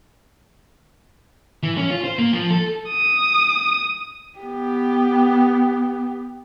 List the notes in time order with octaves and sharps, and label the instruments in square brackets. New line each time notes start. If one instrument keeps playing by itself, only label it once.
[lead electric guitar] E3
C#4
F4
C5
A#3
F3
A4
[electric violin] D#6
[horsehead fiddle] B3 G4